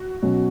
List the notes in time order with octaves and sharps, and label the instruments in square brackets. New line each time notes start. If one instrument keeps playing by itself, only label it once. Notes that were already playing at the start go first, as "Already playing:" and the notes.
Already playing: [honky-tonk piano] F#4
[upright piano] B2 F#3 C#4